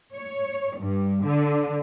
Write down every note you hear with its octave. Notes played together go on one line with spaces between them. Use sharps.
C#5
G2
D3